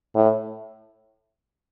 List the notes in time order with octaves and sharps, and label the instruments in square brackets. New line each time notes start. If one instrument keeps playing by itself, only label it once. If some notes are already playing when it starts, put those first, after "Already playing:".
[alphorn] A2